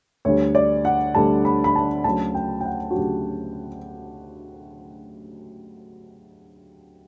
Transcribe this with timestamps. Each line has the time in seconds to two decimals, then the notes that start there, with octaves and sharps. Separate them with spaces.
0.25 D2 D3 G3 C#5
0.55 D5
0.85 F#5
1.15 D2 D3 G3 A5
1.45 B5
1.64 B5
1.76 A5
2.04 D2 C#3 F#3 A5
2.35 G5
2.60 G5
2.65 F#5
2.91 F#4
2.94 D2 C#3 F#3 G4